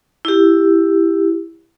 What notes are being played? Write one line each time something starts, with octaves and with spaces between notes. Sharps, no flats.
E4 G4